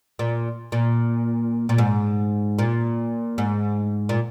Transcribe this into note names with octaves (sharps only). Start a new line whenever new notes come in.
A#2
A#2
A#2
G#2
A#2
G#2
A#2